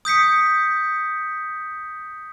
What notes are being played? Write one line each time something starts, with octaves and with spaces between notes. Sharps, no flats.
D#6 G6 B6 C#7